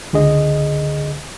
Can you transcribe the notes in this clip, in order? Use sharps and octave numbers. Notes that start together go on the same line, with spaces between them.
C#2 D3 G#4 D#5